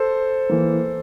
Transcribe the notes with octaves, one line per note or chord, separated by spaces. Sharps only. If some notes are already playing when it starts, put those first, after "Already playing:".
Already playing: A4 C5
E3 A#3